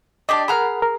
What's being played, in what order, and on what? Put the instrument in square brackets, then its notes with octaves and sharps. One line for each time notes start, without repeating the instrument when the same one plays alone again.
[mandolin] D4 G4 D5 [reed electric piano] D#5 A5
[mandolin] G#4 A#5 F6 [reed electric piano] A#4 F#5 B5
[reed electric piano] A#4